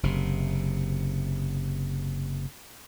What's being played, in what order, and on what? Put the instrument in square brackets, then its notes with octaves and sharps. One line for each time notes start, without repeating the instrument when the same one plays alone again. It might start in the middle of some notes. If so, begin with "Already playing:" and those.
[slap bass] F#1 C3